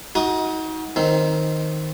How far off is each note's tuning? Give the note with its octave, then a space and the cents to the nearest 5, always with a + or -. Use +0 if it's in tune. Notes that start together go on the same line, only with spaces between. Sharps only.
D#4 +35 F#4 +0 D#6 -5
D#3 +0 C4 +0